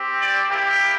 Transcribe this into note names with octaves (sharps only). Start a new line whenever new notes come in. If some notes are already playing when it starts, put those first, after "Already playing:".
Already playing: C4 G4
D5
A#3 E4 G4